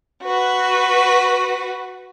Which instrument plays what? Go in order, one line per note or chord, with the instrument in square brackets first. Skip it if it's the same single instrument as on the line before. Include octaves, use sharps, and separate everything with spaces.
[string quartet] F#4 B4